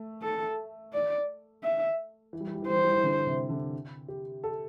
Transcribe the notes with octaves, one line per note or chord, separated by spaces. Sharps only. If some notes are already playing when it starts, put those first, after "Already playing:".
Already playing: A3
A4
D5
E5
E3
G3
E3
G3
E3
G3 C5
E3
G3
E3
D3
C3
D3
G4
A4